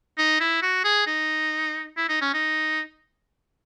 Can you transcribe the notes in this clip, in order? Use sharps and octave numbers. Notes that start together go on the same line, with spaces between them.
D#4
E4
F#4
G#4
D#4
E4
D#4
C#4
D#4